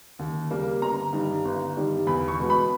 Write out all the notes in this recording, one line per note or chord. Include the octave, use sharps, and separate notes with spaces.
D#2
C#3 G3 A#3
G1 A#5
G2 D#3 G3
G1
G2 D#3 G3
E2 B5
C#6
B2 G#3 B3
B5